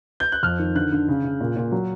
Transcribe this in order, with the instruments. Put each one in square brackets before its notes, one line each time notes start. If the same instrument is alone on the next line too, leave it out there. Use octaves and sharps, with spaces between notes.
[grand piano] G6
F#6
F2 F6
D#3
D3 F#6
D3
C#3
C#3
A#2
A#2
F#3